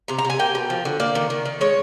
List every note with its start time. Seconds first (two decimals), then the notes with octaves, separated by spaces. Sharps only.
0.08 C3 A#5
0.19 A#5
0.25 C3
0.30 G#5
0.39 A#3 G5
0.55 B2
0.70 F3
0.85 D3
1.00 A#3 D5
1.15 D#3
1.30 D#3
1.45 D#3
1.61 G#3 C#5